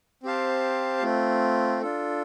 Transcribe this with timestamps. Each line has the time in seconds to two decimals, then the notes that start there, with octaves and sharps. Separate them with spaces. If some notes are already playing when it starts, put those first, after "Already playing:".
0.23 C4 G4 C5 F5 A5
1.03 A3 C4 F4
1.81 D4 F4 A4